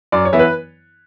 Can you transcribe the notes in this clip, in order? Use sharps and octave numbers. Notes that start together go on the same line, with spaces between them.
F#2 D5
C#5
E3 B3 E4
B4